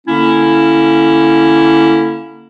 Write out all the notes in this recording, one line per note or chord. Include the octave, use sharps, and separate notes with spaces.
D3 A#3 C#4 E4